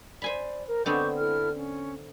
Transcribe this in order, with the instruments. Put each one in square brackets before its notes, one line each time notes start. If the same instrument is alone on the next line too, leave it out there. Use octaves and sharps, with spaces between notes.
[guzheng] C5 G#5 B5 [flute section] D5
[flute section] A#4
[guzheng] D3 B3 C4 [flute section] C#6 D6 G6
[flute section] E4 A4 F6
C#4